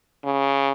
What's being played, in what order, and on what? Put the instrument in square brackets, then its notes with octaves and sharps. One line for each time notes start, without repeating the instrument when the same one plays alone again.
[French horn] C#3